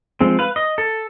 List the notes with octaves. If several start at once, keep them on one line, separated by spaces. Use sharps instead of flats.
F3 G#3 C4
B4 F5
D#5
A4